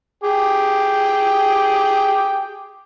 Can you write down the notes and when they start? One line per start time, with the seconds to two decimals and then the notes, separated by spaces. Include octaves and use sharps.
0.24 G#4 G5 D6